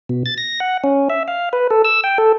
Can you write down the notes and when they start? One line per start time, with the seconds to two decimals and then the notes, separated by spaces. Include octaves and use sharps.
0.09 B2
0.26 A6
0.38 A#6
0.60 F#5
0.84 C#4
1.10 E5
1.28 F5
1.53 B4
1.71 A4
1.85 E6
2.04 G5
2.18 A4